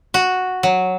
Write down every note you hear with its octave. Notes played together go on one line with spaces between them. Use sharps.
F#4
F#3